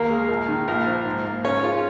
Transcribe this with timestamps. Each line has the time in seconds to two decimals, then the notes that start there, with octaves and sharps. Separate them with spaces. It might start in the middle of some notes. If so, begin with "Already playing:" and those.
Already playing: D#2 A#3 A#4
0.10 G#3
0.29 A#1
0.48 D#3
0.68 A#1 A#3 A#4
0.86 F3
1.06 G#2
1.25 A#3
1.44 G#2 C#4 C#5
1.63 G#3 F4 F5